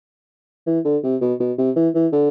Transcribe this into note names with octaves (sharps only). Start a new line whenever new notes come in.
E3
D3
C3
B2
B2
C3
E3
E3
D3